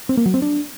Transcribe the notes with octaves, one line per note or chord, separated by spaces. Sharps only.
C4
A#3
F#3
C4
D4